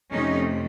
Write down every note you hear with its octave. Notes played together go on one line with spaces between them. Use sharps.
F2 C3 F3 A3 C#4 D#4